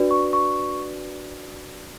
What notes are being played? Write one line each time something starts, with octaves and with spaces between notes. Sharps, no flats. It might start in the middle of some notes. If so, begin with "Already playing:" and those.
Already playing: D4 F#4 B4 D5
C#6
C#6